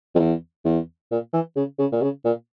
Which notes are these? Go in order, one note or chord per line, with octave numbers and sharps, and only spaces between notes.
F2
E2
E2
A#2
E3
C#3
C#3
A#2
C#3
A#2